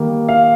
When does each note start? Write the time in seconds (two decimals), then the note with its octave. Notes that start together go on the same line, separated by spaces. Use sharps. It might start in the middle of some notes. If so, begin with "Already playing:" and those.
Already playing: D#3 G3 A#3
0.29 F5